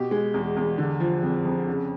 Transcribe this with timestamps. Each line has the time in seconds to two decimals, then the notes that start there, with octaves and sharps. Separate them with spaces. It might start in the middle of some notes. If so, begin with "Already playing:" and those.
Already playing: B2 G4
0.11 G#3
0.34 E2
0.57 E2
0.78 D3
1.00 F3
1.23 F2
1.45 F2
1.68 C#3